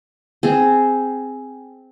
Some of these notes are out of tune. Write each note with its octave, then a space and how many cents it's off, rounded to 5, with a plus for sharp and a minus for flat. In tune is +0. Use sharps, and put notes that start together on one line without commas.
C4 -5 G#4 +5